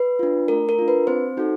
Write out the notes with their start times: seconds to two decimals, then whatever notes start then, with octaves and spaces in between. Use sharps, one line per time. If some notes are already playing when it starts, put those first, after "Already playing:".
Already playing: B4
0.19 D4 F4
0.48 A3 A#4
0.69 A#4
0.79 D4 F4
0.88 B4
1.07 C4 C5
1.37 D#4 F#4 A4